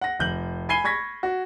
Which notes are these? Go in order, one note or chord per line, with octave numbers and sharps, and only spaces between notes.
F#5 A#6
F1 G6 F#7
G#5 B5 G#6 C7 D#7 G7
B5 C#6 G#6 A#6 B6
F#4